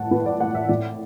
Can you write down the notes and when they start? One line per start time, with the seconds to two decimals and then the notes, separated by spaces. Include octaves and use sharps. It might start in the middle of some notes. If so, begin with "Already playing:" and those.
Already playing: A2 A3 F#5 A5
0.11 A2 B4
0.26 D5
0.40 A3 F#5
0.55 E5
0.69 A2 D5